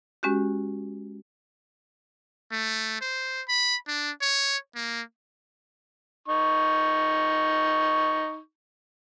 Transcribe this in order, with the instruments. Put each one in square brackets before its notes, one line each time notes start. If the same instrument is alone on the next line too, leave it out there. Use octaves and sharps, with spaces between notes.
[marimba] G#3 C#4 F#4 G4
[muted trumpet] A3
C5
B5
D4
C#5
A#3
[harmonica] D#4 C#6